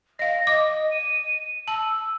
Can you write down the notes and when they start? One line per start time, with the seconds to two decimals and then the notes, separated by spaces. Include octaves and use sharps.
0.19 D#5 F5 A#6
0.47 D#5 D6
0.91 D#7
1.68 A5 E6